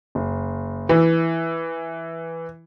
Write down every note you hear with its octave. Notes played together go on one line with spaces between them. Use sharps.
F#1
E3